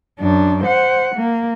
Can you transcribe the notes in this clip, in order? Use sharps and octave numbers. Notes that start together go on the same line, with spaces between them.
F#2 D4
C5 F#5
A#3